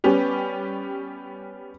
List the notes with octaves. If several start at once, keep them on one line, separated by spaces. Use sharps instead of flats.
G3 B3 C#4 G4